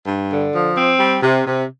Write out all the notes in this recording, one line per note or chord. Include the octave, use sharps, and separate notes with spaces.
G2
D3
F3
C4
G3
C3
C3